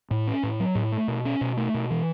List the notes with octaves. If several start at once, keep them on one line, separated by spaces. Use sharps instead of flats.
A2
C#4
A2
F#3
A2
A3
B2
C#4
B2
A3
B2
E3